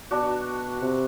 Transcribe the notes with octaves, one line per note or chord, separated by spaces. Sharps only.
B2 D4 F#4
C3